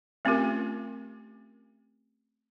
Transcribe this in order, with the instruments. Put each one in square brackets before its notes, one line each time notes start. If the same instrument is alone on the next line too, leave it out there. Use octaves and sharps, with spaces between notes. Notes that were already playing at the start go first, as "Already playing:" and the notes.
[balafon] A3 C4 C#4 F4 G4 A#4